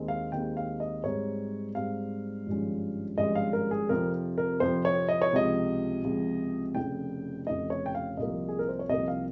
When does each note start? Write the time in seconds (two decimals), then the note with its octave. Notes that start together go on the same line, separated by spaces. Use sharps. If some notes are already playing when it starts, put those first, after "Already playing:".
Already playing: D#2 D#3 G#3 C4
0.08 F5
0.32 D#2 D#3 G#3 C4 G5
0.57 F5
0.80 D#5
1.04 G#2 G3 C4 C#5
1.75 G#2 G3 C4 F5
2.46 G#1 G2 F3 G#3 C#4
3.18 G#1 G2 F3 G#3 C#4 D#5
3.35 F5
3.53 A#4
3.71 G#4
3.89 F2 C3 F3 C4 A#4
4.38 A#4
4.60 F2 C3 F3 C4 C5
4.85 C#5
5.09 D#5
5.22 C#5
5.33 C#2 C3 F3 D#5
6.04 C#2 C3 F3
6.75 F1 F2 C#3 G5
7.47 F1 F2 C#3 D#5
7.70 C#5
7.86 G5
7.95 F5
8.17 C2 C3 F3 A#3 D#5
8.49 G#4
8.59 A#4
8.69 C5
8.79 C#5
8.89 C2 C3 F3 A#3 D#5
9.08 F5